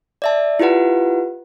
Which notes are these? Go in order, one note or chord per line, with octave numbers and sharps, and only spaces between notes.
D5 E5 A5
E4 F4 G4 B4 F#5